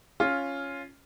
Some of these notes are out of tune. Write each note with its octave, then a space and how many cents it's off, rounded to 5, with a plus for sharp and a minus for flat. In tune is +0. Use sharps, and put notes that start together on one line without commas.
C#4 +0 F4 +0